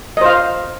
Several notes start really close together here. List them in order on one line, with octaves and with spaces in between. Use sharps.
D#5 C5 F5